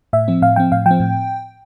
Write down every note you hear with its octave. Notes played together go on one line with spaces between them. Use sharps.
A2 E5
F3 C4
A2 F5
F3 C4 G5
A2 F5
F3 G5
C4
A2